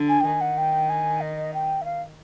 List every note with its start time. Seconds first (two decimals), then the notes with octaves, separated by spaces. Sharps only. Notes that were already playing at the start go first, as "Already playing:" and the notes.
Already playing: D3
0.09 G#5
0.20 G5
0.25 D#3 G#5
0.41 F#5
0.58 G5
0.89 G#5
1.21 D#5
1.54 G5
1.82 E5
1.85 F5